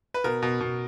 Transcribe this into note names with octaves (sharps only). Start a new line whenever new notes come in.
B4
B2 A#4
B2
B2